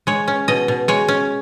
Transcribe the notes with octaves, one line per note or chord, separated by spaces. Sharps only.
G#3 C#5
C#4
B2 D#5
B2
G#3 C#5
C#4